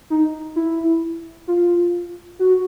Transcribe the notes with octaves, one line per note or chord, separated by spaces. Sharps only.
D#4
E4
F4
F#4